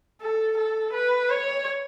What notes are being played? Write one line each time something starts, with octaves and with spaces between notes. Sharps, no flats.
A4
A4
B4
C#5